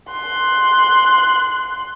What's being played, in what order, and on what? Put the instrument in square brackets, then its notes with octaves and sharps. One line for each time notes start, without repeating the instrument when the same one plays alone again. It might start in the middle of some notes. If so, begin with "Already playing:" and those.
[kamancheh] C6 F#6